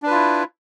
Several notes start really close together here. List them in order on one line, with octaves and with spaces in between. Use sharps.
D4 B4 F4 E4